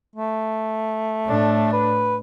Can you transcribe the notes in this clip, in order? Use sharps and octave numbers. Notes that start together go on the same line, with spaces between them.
A3
A2 D4
B4